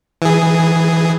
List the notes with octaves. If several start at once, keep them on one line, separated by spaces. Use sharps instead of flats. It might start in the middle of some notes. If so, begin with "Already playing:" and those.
E3 G#4